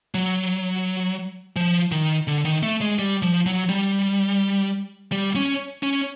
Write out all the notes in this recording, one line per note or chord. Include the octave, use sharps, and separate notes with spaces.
F#3
F3
D#3
D3
D#3
A3
G#3
G3
F3
F#3
G3
G3
C#4
C#4